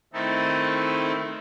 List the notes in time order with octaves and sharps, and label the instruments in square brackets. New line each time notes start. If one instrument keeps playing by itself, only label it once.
[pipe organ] D#3 A3 C4 D#4 E4 A4